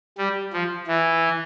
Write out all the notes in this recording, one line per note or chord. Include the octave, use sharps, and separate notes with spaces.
G3
F3
E3